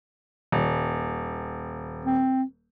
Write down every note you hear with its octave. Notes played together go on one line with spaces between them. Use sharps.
D#1
C4